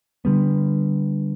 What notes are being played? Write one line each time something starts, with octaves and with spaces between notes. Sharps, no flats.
D3 G3 B3